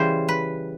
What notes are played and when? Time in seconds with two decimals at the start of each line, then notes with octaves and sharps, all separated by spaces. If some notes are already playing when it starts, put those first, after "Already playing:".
Already playing: C#3 E3 G3 C5
0.29 B4